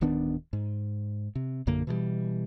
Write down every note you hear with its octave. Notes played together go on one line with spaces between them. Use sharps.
D1 D#3 B3 D4
G#2
C3
A#1 F#2 D3 A#3
B2 E3 F3 G3